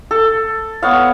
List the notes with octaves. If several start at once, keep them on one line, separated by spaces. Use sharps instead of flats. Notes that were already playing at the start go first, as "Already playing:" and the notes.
A4
B3 C#5 F5